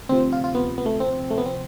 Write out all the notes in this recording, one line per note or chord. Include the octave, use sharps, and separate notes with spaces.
D2 C3 F3 C4
F4
F4
B3
B3
A3
C4
A3
B3
C4